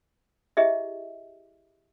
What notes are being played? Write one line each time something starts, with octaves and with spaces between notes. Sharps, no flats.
E4 G4 G#4 D#5 E5